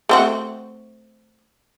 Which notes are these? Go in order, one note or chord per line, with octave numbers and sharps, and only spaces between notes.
A3 C4 F#4